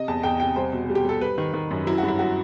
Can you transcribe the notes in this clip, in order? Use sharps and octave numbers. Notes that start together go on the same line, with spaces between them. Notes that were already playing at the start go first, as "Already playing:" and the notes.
Already playing: C3 D#5
E2 A5
E2 G5
C3 G5
G3 C5
B2
G3
G4
G3 A4
G3 B4
D#3
D#3
F#2
F#3 E4
G2 F#4
E4
F#3 F#4